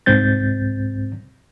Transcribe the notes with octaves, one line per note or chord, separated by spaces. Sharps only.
C2 G#2 C4 G6 A6